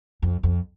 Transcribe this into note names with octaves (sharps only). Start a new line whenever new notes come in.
F2
F2